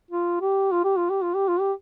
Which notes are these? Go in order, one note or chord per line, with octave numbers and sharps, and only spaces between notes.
F4
G4
F4
G4
F4
G4
F4
G4
F4
G4